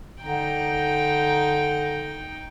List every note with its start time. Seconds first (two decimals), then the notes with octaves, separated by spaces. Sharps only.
0.22 D3 D#4 G5